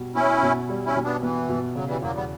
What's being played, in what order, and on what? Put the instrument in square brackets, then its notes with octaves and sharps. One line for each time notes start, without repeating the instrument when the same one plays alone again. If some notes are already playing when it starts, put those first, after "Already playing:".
Already playing: [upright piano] B2 G3
[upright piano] B3 [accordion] C#4 E4
[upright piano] B2
G3
[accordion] C#4 E4
[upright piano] B2
[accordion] B3 D4
[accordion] E3 [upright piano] B3
[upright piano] B2
[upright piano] C#3 [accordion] F#3
[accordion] E3 G3
[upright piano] E2 [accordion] F#3 A#3
[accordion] G3 B3